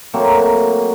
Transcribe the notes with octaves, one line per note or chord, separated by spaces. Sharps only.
F#3 A3 A#3 C4